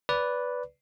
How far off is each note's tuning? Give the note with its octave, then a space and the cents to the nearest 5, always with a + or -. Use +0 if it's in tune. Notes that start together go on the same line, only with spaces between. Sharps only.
B4 +0 D5 -15